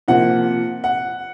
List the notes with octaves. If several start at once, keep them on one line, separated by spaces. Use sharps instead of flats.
C3 F3 A#3 F#5
F#5